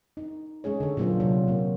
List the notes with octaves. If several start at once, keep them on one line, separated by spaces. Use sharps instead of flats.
D#4
G#3 C#4 G#4 C#5
D3 A4
A#2 F#3 A#3 D4 F4 C5
C3 F#3
A#2 A#3